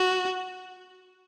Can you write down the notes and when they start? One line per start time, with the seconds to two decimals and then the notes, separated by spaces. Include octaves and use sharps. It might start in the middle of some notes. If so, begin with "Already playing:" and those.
Already playing: F#4